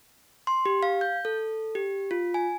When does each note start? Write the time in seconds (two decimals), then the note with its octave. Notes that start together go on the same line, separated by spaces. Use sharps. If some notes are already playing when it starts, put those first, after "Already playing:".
0.47 C6
0.66 G4
0.83 F5
1.01 G6
1.25 A4
1.75 G4
2.11 F4
2.34 G#5